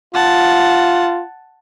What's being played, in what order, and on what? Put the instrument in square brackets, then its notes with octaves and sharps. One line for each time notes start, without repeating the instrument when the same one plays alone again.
[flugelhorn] F4 [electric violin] F#5 A5